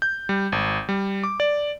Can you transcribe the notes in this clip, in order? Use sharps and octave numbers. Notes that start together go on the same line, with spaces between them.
G6
G3
G#1
G3
D6
D5